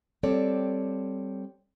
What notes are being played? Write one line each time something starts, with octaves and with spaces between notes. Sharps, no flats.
G3 C4 A4 C#5 D5